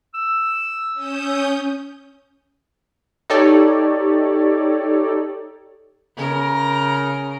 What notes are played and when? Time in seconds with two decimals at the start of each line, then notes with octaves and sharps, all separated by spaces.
0.14 E6
0.94 C#4 D#6 G6
3.30 D#4 G4 A4 C#5 D5
6.16 C#3 A#4